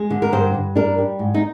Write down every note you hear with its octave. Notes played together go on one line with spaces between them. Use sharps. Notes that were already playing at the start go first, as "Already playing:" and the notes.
Already playing: G#3
D3
A#4
G2 C5
G2
D4 A#4
G3
G#2
D#4